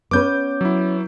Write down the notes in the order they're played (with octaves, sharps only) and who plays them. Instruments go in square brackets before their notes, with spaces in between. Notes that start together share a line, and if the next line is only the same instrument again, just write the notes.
[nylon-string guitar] B3 C#4 B4 [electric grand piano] D6 G6
[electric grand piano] F#3 E4